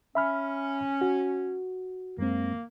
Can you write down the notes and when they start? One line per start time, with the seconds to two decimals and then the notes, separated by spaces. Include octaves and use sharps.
0.15 C#4 E5 B5 F6
1.01 F#4
2.18 F#2 G#3 A#3 C4